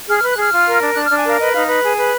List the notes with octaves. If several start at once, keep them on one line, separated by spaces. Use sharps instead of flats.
G#4 F6
F6
B4
F#6
G#4 F6
F4
A#4
D4
D4 F#6
F6
D4
G#5
A#4 F5
B4 D#5
D#4 F5
B4
G#4
B4